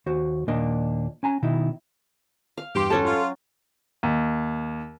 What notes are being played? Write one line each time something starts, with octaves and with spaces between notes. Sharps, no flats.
D#2 F#4 C5
D#2 A#2 A#3 D4 D#5
C#4 G#5 A#5
B2 D#3 D#4 E4
F5
E2 G2 G4 C6
F#3 C#4 A4 A5
F4
D#2